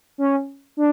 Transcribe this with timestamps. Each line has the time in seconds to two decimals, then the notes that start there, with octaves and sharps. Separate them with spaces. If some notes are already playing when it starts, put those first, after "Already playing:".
0.18 C#4
0.77 D4